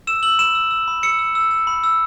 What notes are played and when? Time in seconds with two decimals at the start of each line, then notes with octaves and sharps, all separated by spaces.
0.07 E6 E7
0.23 E6 F#7
0.39 B5 E7
0.55 E6
0.71 E6
0.88 B5
1.03 E6 C#7
1.19 E6
1.35 E6
1.51 E6
1.67 B5
1.84 E6